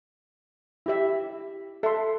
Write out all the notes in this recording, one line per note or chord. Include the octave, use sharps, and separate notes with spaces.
E4 G4 E5
A4 E5 C6